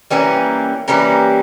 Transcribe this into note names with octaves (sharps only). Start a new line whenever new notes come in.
E3 G3 A#3 C#4
E3 G3 A#3 C#4